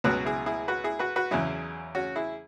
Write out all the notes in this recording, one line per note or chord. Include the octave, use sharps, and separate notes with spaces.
C#2 B2 F#3 F#4 B4
E4 G#4
E4 G#4
F#4 B4
E4 G#4
F#4 B4
F#4 B4
E2 C#3 F#3 E4 G#4
C#4 F#4
E4 G#4